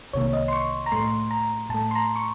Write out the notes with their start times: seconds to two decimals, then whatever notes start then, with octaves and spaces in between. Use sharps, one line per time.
0.13 C2 C3 D#3 A#3 C#5
0.33 D#5
0.48 C6
0.53 C#6
0.86 A#5
0.92 A2 A3 C6
1.31 A#5
1.70 A2 A5
1.74 A3
1.91 C6
1.95 A#5
2.16 C#6